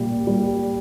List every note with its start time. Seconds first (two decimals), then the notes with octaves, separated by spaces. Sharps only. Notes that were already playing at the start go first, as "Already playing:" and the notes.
Already playing: A#2 G3 A#3
0.27 G3